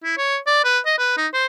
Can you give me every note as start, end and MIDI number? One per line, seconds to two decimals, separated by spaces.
0.04 0.17 64
0.18 0.38 73
0.47 0.62 74
0.64 0.79 71
0.86 0.94 75
0.98 1.14 71
1.17 1.27 63
1.34 1.46 72